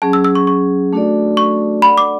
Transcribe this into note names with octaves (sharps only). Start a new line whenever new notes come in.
F#3 C#4 G#4 A5
E6
E6
C#6
C#6
A3 D4 F#4 A4 D5
C#6
D4 A4 D5 F#5 B5
D6